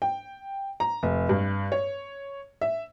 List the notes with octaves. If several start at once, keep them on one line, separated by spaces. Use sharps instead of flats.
G5
A#5
F1
G2
C#5
E5